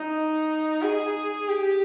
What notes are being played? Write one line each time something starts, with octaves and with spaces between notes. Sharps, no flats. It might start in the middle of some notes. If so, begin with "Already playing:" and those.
Already playing: D#4
G#4
G4